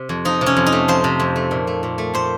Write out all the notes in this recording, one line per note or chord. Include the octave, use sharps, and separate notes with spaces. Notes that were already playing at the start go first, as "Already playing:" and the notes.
Already playing: C3
F2
F3 D#4
C3
C#4
F2
D#4
A3
F3 C5
C3
F2
A3
A#2
A3
A#2
A3
A#2 C5